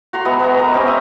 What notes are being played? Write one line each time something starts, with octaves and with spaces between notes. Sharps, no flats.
F#4 A#5 C6
G#3 B3 E5
B3 A#5
A#4 D#5 A#5
C4 C#4 G4
E5 D#6